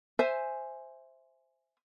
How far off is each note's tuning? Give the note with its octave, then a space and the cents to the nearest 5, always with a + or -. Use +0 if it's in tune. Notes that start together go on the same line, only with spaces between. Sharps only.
C5 +0 E5 +0 G#5 +0